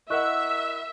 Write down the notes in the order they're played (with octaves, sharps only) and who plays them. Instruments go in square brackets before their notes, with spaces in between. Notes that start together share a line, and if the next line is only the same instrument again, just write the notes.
[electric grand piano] E4 A#4 F#5 [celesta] D#5 C#6 F#6 [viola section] E5